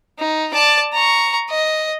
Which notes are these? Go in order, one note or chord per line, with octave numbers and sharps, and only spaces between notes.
D#4
D5 A5
A#5 C#6
D#5